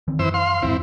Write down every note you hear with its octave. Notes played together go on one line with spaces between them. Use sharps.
D#3 E3 C4
F#2 E3 C5 E6
F5 C6
D#1 E2 G#2 C4 E4